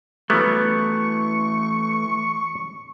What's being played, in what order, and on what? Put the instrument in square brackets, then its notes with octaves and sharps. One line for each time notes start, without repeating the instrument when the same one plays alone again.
[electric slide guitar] E3 A3 [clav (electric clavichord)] F#3 G3 B3 [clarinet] C#6